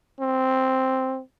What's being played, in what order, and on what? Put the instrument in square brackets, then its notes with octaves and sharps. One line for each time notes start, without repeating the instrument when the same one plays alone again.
[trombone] C4